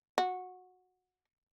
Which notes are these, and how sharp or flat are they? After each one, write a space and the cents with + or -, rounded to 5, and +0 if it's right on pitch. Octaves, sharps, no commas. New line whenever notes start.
F#4 -15